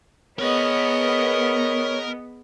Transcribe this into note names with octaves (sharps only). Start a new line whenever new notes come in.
B3 G#4 A#4 C#5 D#5 B5